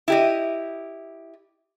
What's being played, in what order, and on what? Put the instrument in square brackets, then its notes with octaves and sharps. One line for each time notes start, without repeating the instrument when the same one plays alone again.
[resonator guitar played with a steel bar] E4 G4 D#5